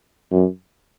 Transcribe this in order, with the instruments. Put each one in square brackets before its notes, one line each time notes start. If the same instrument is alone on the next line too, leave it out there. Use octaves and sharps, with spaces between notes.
[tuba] F#2